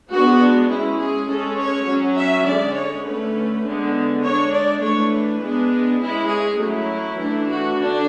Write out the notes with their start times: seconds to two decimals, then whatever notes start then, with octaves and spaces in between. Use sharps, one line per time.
0.10 G#3 B3 D4 F#4
0.40 D4
0.69 G#3 C#4 E4
0.99 G#4
1.29 G#3 C#4 A4
1.58 C#5
1.87 F#3 C#4
2.17 E5
2.46 D3 G#3 C#4 D5
2.76 C#5
3.05 D3 A3 C#4 B4
3.65 D3 G#3 B3
4.23 G#3 D4 C#5
4.53 D5
4.82 E3 A3 D4 C#5
5.13 B4
5.42 G#3 B3 D4
6.01 G#3 C#4 E4
6.29 G#4
6.59 F#3 A3 C#4 E4
7.18 E3 A3 D4
7.48 F#4
7.77 D3 D4